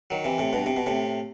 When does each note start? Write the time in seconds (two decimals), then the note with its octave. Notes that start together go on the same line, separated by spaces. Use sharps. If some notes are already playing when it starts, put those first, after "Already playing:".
0.10 D#3 F#3
0.24 C3 E3
0.38 A2 C3
0.53 G2 B2
0.66 C3
0.77 B2
0.86 A2 C3